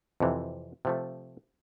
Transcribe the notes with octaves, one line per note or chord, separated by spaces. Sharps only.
F2 C3 E3
C3 F3 A3